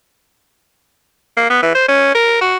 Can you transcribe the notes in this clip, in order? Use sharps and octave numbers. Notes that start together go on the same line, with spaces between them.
A#3
B3
E3
C5
C#4
A#4
F#4